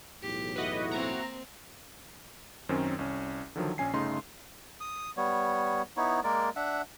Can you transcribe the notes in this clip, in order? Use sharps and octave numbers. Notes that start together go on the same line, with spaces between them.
B1 E2 A2 G4
E4 F#4 B4 D#5
A#3 C4 A#5
F#2 D#3 C4 C#4
C2 C#4
D3 D#3 F3 F#3
A#1 C#4 G#5 C7
G1 C#3 A3 D#4 A4 C6
D#6
G3 B3 C#5
B3 D#4 E4 C#5
G#3 A#3 A#4 D5
D4 E5 F#5